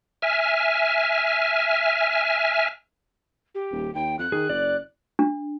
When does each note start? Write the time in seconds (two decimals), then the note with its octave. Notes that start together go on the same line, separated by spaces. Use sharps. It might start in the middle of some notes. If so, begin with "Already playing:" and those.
0.22 E5 G#5 F6
3.55 G4
3.72 D#1
3.95 D#2 G5
4.19 F2 F#6
4.32 D#3 G#4
4.49 F#1 D5
5.19 D4